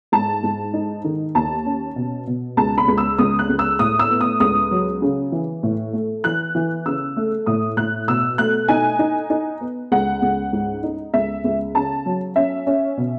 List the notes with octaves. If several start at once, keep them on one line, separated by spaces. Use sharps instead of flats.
G#2 A5
G#2
D#4
D#3
D#2 A5
C#4
B2
B2
C#2 A5
B5
C#2
E6
C#2 D#6
F#6
C#2
E6
A2 D#6
E6
B3
D#6
C#2 D#6
F#3
C#3
E3
A2
A3
E3 F#6
E3
C#3 E6
A3
A2 D#6
A2 F#6
B2 E6
A3 F#6
D#4 G#5
D#4
D#4
B3
C#2 F#5
C#2
G#2
D#4
C#2 E5
C#2
C#3 A5
F#3
C#4 E5
C#4
B2